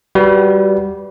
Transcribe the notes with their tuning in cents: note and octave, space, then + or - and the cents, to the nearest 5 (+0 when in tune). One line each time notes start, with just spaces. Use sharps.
G3 -10 F#4 +10 B4 +0